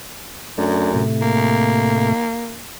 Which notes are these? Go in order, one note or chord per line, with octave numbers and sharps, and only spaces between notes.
F#2 A3 D4
A2 C3 A3
A#3